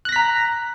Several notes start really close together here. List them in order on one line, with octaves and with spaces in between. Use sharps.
F#6 A#6 B6 A#5